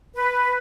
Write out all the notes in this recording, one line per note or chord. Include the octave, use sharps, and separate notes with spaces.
B4